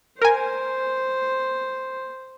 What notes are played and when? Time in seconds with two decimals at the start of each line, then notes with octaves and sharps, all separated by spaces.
0.22 A#4 C5 G#5